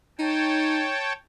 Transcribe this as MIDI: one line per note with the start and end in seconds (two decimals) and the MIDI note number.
0.19 0.91 63
0.19 1.13 73
0.19 1.13 79
0.19 1.13 81